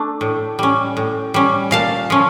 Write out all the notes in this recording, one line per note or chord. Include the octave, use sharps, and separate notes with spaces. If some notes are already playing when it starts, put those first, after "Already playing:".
Already playing: A3 D4
A2
G3 C#4
A2
G3 C#4
A#2 F5 A5
F3 C#4